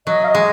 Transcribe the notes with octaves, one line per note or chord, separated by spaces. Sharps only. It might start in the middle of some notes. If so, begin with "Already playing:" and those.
F#3 D#5
F5
D#5
G#3